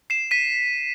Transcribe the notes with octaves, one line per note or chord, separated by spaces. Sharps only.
C7 E7
B6 D#7